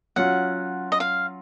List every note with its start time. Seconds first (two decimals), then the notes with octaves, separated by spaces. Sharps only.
0.16 F#3 C#4 F4 F#5
0.92 D#5
1.00 F5